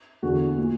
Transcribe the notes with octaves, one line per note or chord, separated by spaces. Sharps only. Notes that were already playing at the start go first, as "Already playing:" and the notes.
E2 D3 F#4
A#2